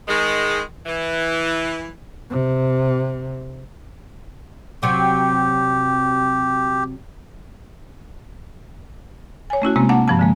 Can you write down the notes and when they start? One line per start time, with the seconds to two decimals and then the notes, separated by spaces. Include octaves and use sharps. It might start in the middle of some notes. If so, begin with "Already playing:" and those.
0.08 D#3 G#3
0.86 E3
2.30 C3
4.83 C3 F#3 G4
9.50 C#5 G#5
9.62 A3 C#4 E4 F#4
9.76 C3 G#3 A#3 C4
9.89 A#3 D4 F#5 A5
10.08 G2 F3 A5
10.19 D3 G#3 A#3